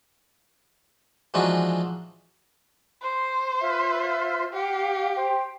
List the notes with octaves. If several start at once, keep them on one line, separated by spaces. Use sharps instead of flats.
E3 F3 G#3 D4 D#4 F#4
C5
F4 E5
G4 F5 F#5
C5 G5